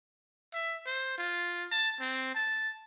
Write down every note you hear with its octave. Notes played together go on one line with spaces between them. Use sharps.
E5
C5
F4
A5
C4
A5